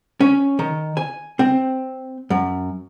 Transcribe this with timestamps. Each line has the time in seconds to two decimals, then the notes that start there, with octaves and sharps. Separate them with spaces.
0.20 C#4
0.59 D#3
0.97 G#5
1.39 C4
2.30 F#2